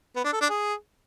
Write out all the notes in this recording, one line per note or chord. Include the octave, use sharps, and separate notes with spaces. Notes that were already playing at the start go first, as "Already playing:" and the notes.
B3
D4
A4
D4
G#4